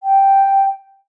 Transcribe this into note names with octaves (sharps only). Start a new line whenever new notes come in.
G5